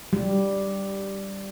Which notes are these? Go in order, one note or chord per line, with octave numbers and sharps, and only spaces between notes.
G3